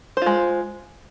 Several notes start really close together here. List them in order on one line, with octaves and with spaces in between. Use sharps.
C5 F4 G#3